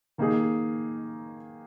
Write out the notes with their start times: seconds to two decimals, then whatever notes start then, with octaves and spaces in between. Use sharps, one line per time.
0.18 D#3 A#3 D#4 G#4